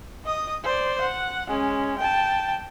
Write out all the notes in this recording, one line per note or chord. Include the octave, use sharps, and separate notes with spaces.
D#5 D#6
C5 D5
F#5
G#3 C#4
G5 A5